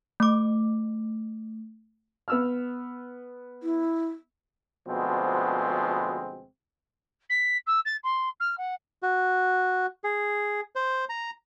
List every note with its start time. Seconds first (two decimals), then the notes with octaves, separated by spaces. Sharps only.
0.20 A3 D6
2.28 B3 E6 F6
3.63 E4
4.87 D2 B2 F3 G#3 B3 C4
7.29 B6
7.66 E6
7.85 A6
8.03 C6
8.40 F6
8.58 F#5
9.03 F#4
10.04 G#4
10.76 C5
11.09 A#5